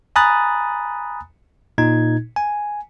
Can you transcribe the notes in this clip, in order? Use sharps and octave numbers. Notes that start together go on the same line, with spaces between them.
G#5 A#5 B5 D#6 F#6 A6
A#2 D#4 G#6
G#5